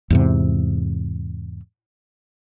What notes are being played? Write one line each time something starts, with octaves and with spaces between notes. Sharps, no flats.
E2 G#2 C3